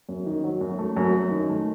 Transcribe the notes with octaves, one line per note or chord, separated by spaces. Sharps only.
F#2
D#3
F#3
F#2
A3
F#2
F#2
D#3
A3